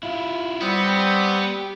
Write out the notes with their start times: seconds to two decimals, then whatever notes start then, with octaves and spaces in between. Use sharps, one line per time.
0.03 E4 F4
0.61 G3 B3 C4 F#5 D#6
0.84 G4